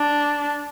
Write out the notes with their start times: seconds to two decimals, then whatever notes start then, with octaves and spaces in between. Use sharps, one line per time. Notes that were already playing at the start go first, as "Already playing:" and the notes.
Already playing: D4